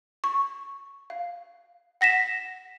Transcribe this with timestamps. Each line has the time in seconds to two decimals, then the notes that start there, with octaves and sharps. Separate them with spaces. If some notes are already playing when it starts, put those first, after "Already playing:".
0.24 C#6
1.10 F5
2.01 F#5 A#6 B6 E7